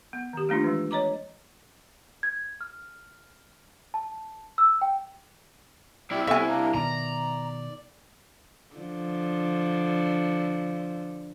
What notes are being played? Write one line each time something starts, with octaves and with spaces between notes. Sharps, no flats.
B3
D#3 G4
A3 A#3 D4 D#4 F4
E3 G#3
C#5 D#5 A#5 D6
G#6
F6
A5
E6
G5
C2 E4 G4 D5
C3 E3 B3 E5 G#5 C#6
A#3 D4 A#4
B2 D#3 D5 A#5
D3 F3